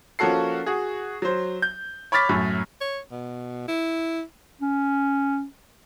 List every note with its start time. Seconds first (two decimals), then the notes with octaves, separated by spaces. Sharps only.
0.19 F3 A#3 C#4 F#4 A4 C7
0.66 F#4 G#4
1.22 F#3 C5
1.62 G6
2.12 C#5 B5 D6 F6 A6 B6
2.29 F#2 A2 F#3
2.81 C#5
3.11 B2
3.68 E4
4.61 C#4